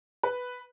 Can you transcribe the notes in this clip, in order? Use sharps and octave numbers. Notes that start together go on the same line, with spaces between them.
B4